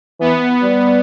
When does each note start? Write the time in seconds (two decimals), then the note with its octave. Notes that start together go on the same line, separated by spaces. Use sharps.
0.20 E3 B3
0.63 G3